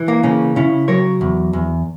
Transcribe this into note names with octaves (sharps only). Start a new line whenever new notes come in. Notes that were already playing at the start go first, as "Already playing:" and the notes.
Already playing: E3
A#3
C#3 A#3 C#4
C#3 C#4 E4
F#3 A#4 C#5
E2
E2